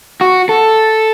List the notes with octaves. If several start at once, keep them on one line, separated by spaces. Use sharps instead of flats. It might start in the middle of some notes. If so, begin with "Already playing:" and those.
F#4
A4